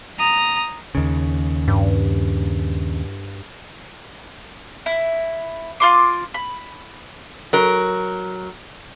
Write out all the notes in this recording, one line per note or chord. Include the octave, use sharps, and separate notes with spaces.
A#5 D#6
D#2 C#3
G2
E4
F4 C6 D6
B5
F#3 A#4